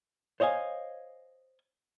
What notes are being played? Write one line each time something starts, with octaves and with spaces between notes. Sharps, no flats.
C5 C#5 D#5 F5 G#5